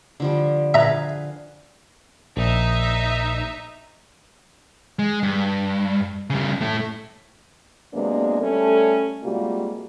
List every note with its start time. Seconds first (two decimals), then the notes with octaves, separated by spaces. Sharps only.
0.20 D3 F3 G3
0.74 G#4 B4 E5 F5 A#5
2.37 A#1 D#4 E5
4.99 G#3
5.23 G2
6.30 C#3 G3
6.61 A2 A3
7.93 C3 F#3 G#3 A#3 B3 D4
8.39 G3 A3 C#4 A4
9.23 C3 G3 G#3 A#3 F4 F#4